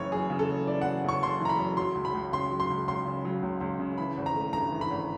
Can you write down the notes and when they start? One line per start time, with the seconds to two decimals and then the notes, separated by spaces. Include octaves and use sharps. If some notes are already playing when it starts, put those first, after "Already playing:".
Already playing: F#1 C#3 E3 C#5
0.12 F#2 G#4
0.30 C#3
0.39 A4
0.49 F#1
0.67 E3 D5
0.81 F#2 F#5
1.04 C#3 C#6
1.23 F#1 C6
1.40 E3 A#5
1.49 B5
1.59 F#2
1.77 F#3 C6
1.95 C#2
2.05 B5
2.14 C#2
2.33 C#3 C6
2.51 F#3
2.60 C6
2.70 C#2
2.88 C#2 C6
3.06 C#3
3.25 F#3
3.42 C#2
3.61 C#2
3.80 C#3
3.98 E3 B5
4.17 G#1
4.26 A#5
4.36 A3
4.53 G2 A#5
4.72 E3
4.81 B5
4.91 G#1